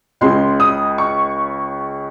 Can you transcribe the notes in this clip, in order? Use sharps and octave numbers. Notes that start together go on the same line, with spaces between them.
C#2 C#3 G#3 C6
D#6
C#6